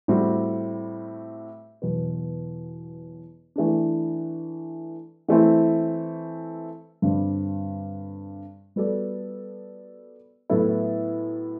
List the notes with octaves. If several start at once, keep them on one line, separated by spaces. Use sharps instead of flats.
A2 G3 C4 F#4
E2 B2 F#3 B3
E3 A3 D4
E3 A3 C4 E4
G2 D3 G3 C4
G3 B3 F#4 A4 D5
A2 F#3 B3 E4 A4